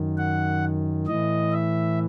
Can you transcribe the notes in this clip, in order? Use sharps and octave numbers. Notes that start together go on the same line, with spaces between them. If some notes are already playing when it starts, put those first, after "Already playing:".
Already playing: F#2 D#3
F#5
A2 E3 D#5
E5